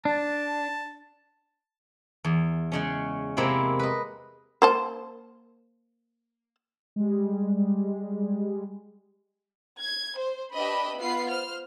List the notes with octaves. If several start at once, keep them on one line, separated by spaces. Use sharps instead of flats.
D4 A5
E2
C#3 G#3 C#4
C3 G#3 A#3 C4 E4
B4 D#5
A#3 C5 A5
G3 G#3
G#6
C5
D4 G4 B4 D#5 E5 B5
B3 F4 B4 C7
C5 F6